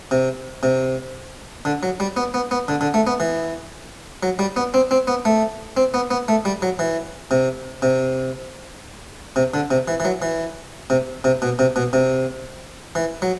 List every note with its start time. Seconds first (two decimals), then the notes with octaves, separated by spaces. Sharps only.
0.11 C3
0.63 C3
1.65 D3
1.83 F#3
2.00 G3
2.17 B3
2.34 B3
2.51 B3
2.68 D3
2.81 D3
2.94 A3
3.07 B3
3.20 E3
4.23 F#3
4.39 G3
4.56 B3
4.74 C4
4.91 C4
5.07 B3
5.25 A3
5.77 C4
5.94 B3
6.11 B3
6.28 A3
6.45 G3
6.62 F#3
6.79 E3
7.31 C3
7.82 C3
9.36 C3
9.54 D3
9.71 C3
9.88 E3
10.00 E3
10.05 F#3
10.22 E3
10.90 C3
11.24 C3
11.42 B2
11.59 C3
11.76 B2
11.93 C3
12.95 E3
13.22 F#3